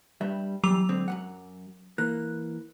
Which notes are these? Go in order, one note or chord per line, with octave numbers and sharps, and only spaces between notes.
G2 G3 E5
E2 G#2 F#3 G3 D6 F7
D3 G#3 C4
F#2 E3 F#5
E3 A#3 F#6